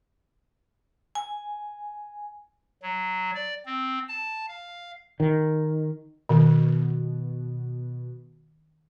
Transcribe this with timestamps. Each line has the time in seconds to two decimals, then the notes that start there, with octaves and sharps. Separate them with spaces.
1.15 G#5
2.83 F#3
3.34 D5
3.66 C4
4.08 A5
4.48 F5
5.20 D#3
6.29 B2 D#3